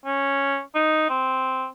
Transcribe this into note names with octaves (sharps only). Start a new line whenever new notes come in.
C#4
D#4
C4